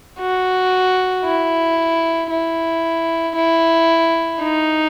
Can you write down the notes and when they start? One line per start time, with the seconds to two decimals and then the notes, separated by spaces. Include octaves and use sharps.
0.19 F#4
1.25 E4
2.30 E4
3.36 E4
4.41 D#4